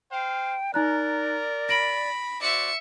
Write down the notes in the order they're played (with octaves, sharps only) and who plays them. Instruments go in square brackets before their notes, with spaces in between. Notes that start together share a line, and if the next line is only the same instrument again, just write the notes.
[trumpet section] C5 F5 [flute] G5
[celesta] D#4 A#5 F#6 [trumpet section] A#4 [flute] D5
[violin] B5 [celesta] A#6 D7 F#7
[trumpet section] F#4 C5 D5 [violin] E5 C#7